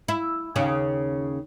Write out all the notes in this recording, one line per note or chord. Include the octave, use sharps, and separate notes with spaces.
E4
D#2 C#3 C#4